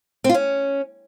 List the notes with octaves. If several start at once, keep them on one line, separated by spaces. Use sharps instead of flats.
C4
F4
C#4